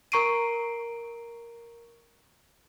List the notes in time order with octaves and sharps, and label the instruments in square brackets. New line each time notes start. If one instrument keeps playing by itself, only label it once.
[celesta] A#4 A#5 C#6 C7 D7 D#7